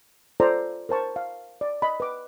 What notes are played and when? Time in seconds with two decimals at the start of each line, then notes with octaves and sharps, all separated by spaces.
0.40 F4 A4 C5 D5 A#5
0.89 A#4 C5 A5 C#6
1.16 F5
1.61 D5
1.82 D#5 B5
2.00 B4 D6